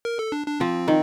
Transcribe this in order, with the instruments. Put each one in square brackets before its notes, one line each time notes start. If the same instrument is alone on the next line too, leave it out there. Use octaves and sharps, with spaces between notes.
[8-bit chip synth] A#4
A4
D4
D4
[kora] F3 [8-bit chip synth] C4
[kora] D#3